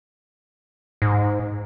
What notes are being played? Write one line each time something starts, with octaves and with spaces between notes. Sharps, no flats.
G#2